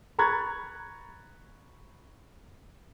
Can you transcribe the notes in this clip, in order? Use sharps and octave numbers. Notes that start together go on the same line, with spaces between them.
A#5 B5 C#6 F#6 G#6 A6